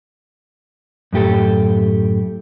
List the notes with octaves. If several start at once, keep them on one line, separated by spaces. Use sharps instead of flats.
F#2 A2 G4 A4